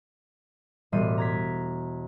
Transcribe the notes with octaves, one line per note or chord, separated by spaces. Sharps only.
E1 A2 G3 C6 D#7
A#5 G#6 B6